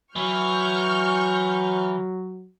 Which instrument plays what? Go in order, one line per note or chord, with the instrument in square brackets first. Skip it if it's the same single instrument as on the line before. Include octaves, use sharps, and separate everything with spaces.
[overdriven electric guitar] E3 [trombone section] F#3 [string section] C#6 F6 G6